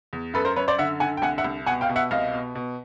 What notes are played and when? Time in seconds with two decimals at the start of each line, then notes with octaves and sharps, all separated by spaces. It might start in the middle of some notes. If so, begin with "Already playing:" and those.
0.13 E2
0.34 F#2 A4 B4
0.45 A#4 C5
0.56 F#2 B4 C#5
0.68 C5 D5
0.78 D3 E5 F#5
1.00 D3 F#5 G#5
1.17 G5
1.22 C2 F#5 G#5
1.38 E5 F#5
1.44 C2
1.66 B2 F#5 G#5
1.81 F5 G5
1.89 B2
1.96 E5 F#5
2.11 C2 D#5 F5
2.34 B2
2.55 B2